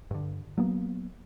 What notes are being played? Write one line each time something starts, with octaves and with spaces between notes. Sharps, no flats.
G2 D3
F#3 A#3 B3